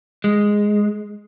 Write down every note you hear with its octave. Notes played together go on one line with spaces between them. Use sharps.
G#3